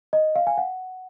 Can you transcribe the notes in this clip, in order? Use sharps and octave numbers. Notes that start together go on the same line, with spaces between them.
D#5
F5
G#5
F#5